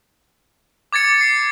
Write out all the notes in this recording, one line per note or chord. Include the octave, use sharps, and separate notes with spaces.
D6 G#6 A6 C#7
C7